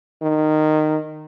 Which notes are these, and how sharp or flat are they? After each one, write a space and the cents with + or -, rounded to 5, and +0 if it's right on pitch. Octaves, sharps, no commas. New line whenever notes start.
D#3 -15